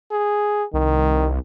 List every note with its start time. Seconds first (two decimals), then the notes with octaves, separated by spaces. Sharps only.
0.12 G#4
0.73 C2 D#3